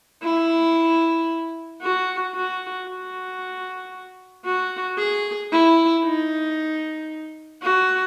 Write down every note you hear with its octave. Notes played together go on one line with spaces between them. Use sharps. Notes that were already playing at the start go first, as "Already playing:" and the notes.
E4
F#4
F#4
F#4
F#4
G#4
E4
D#4
F#4